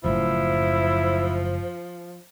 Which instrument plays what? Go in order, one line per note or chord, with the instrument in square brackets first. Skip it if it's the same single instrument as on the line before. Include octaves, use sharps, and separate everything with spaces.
[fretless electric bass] F#1 F#2 A2 [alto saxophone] F3 [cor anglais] E4 [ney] C5